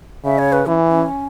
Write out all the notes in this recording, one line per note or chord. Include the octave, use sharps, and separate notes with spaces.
C#3 E5
C#5
B4
E3 C#4
C#4